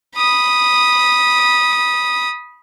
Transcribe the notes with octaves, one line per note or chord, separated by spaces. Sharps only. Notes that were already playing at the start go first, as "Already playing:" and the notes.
B5 D#6